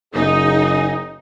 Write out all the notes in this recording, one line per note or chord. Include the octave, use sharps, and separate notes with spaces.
F#1 D#4 G#4 D#5